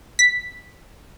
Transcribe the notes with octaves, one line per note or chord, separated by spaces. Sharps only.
B6